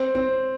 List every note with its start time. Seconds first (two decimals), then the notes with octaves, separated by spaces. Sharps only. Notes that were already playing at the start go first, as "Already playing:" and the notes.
Already playing: C4
0.15 C4